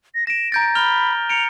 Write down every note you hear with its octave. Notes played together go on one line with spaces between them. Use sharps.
A#6
A#6 D7 E7
A#5 G6 A6 D7
B5 F6 F7 G7
A#5 C#7 D7 F7